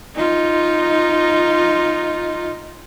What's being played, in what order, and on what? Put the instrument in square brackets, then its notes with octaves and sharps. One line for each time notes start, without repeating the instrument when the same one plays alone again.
[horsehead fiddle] D#4 F4